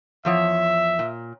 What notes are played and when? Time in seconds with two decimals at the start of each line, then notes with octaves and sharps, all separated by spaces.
0.25 E2 F3 C#5 E5
0.99 A#2